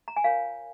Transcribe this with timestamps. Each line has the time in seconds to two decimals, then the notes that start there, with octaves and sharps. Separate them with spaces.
0.08 A#5
0.16 G#5
0.24 F4 A#4 C#5 F5